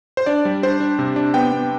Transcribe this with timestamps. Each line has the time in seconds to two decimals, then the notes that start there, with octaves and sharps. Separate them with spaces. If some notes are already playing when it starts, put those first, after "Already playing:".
0.17 C5
0.26 D4 D5
0.45 G3
0.63 D4 C5
0.80 D4
0.99 C3
1.16 D4
1.34 B3 G5
1.52 B3